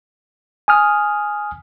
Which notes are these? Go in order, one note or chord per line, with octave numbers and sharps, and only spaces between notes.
G#5 D#6 F6